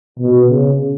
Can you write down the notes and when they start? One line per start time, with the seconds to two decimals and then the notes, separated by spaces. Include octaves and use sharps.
0.20 B2
0.50 C#3